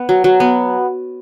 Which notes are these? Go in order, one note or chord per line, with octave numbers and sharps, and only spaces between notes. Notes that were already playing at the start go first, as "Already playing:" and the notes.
Already playing: B3
F#3
F#3
B3